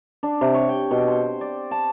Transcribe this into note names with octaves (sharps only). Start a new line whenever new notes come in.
D4
C3
C#5
G5
B2
C5
D5
A5